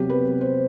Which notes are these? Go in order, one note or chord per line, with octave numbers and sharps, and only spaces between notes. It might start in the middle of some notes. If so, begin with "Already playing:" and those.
Already playing: C3 F#3 B3 G4
B4
C5